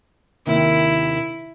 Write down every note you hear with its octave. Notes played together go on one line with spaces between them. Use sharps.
D#2 C3 D#3 E4